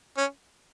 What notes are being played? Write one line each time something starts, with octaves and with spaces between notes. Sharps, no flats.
C#4